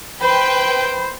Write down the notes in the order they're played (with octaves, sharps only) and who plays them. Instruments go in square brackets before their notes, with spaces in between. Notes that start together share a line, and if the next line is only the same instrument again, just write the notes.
[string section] B4 G5 [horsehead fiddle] C5 [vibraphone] B5